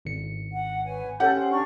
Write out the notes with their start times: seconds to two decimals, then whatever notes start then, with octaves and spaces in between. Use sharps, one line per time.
0.05 G#1 C#7
0.51 F#5
0.84 B4 C#5 G#5
1.20 C#4 G4 A4 F#5 G6
1.33 C5
1.49 D4 C#6 F6